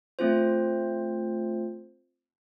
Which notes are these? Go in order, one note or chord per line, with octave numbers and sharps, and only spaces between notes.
A3 C4 F4 C5